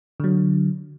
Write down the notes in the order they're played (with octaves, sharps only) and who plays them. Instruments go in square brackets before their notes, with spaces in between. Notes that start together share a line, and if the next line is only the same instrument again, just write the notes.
[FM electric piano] D3 F#3